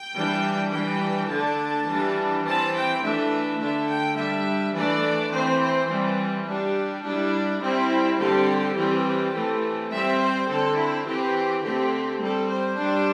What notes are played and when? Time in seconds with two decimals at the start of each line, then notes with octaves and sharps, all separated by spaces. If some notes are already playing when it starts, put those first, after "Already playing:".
Already playing: G5
0.16 E3 G3 D4
0.72 E3 G3 D4 G5
1.30 D3 A3 D4 A5
1.87 E3 G3 D4
2.45 E3 C4 A5
2.73 G5
3.02 E3 A3 D4 E5
3.59 D3 A3 D4 E5
3.88 G5
4.17 G3 D4 E5
4.75 E3 A3 D4 D5
5.32 E3 C4 C5
5.61 C5
5.88 E3 G3 C4
6.46 G3 D4 G4
7.03 G3 D4 E4
7.61 G3 C4 E4
8.18 D3 G3 C4 G4
8.75 E3 G3 C4 G4
9.33 E3 A3 C4
9.90 G3 C4 E5
10.20 C5
10.48 D3 C4 A4
10.77 E4
11.05 E3 C4 G4
11.63 D3 A3 C4 G4
12.20 G3 C4 A4
12.49 C5
12.77 G3 D4